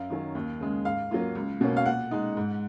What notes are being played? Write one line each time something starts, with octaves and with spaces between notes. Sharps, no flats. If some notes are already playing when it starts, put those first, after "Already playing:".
Already playing: F#2 F5
D#3 F#3 C#4
D#2
C#3 G#3
G#2 F5
F#3 A#3 F4
C#2
B2 A#3 C#4
F5
A#2 F#5
G#3 D#4
G#2